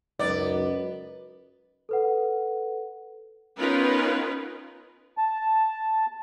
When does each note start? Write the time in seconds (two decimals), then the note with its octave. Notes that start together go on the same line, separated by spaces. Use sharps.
0.20 C#2 F#2 B3 D#4 D5
1.89 A4 B4 F#5
3.58 B3 C#4 D#4 F4 A#4 B4
5.18 A5